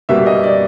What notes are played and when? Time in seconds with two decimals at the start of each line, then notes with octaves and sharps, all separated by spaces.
0.09 B2 G3 A#3 E5
0.26 D#5
0.44 D5